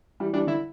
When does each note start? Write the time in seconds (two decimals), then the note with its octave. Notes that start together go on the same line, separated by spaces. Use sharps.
0.20 E3 G3
0.33 E3 G3 D4
0.47 D3 E4